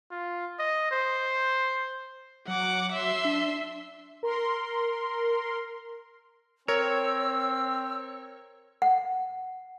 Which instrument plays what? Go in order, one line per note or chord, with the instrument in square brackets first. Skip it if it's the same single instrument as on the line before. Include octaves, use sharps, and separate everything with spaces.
[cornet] F4
D#5
C5
[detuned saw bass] F#3 [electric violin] F#5 D6
[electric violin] E5 C6
[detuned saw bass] D4
[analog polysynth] A#4 C6
[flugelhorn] C4 [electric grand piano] A#4 [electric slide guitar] C#5 [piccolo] E6
[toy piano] F#5